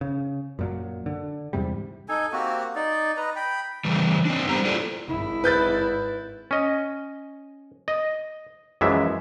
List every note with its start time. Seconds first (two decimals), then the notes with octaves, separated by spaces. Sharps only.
0.01 C#3
0.59 F#2 A#2 F#3
1.06 D3
1.53 E2 G#2 C3 G3
2.09 D#4 A4 G#5
2.33 A#3 C4 F#4 G4
2.76 D#4 D5
3.17 B4 D#5 A#5
3.36 G5 B5
3.85 C#3 E3 G3
4.25 C4 D4
4.49 G3 B3 E4 G4 C5 A#5
4.65 E4 F4 A4 C5 D5 F5
5.08 G#1 E4
5.44 B4 G6 A6
6.51 C#4 D#5
7.88 D#5
8.81 F#2 E3 F3 G#3 E5